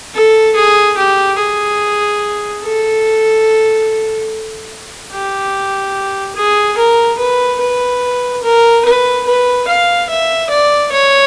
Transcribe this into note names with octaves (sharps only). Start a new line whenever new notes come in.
A4
G#4
G4
G#4
A4
G4
G#4
A#4
B4
B4
A#4
B4
B4
F5
E5
D5
C#5